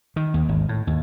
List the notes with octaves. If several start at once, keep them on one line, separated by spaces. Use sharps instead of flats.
D#3
D#2
G#1
A2
D#2